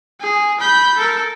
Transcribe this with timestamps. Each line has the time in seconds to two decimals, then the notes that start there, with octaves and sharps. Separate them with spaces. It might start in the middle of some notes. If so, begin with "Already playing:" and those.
0.21 G#4
0.60 B5 G6
0.97 A4 A#4